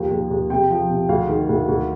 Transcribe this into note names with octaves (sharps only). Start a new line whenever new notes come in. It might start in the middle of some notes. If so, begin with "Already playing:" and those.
Already playing: D#2 F3 G5
D#2
D#2
C3 G5
F3
C3
D2 F5
D#3
D2
D2